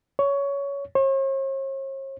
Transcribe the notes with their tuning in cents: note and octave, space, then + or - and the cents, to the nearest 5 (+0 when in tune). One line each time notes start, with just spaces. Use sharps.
C#5 +15
C#5 -45